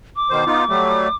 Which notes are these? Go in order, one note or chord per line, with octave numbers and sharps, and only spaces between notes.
D6
B2 D#3 C5
B3 D#4 F4
F#3 G3 A3